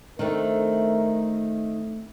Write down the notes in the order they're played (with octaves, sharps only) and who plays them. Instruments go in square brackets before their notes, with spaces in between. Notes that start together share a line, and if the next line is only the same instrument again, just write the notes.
[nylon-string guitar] D#3 [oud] A3 C4 D4 [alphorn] A#4